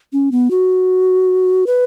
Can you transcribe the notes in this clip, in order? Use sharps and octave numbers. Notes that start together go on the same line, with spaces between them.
C#4
B3
F#4
B4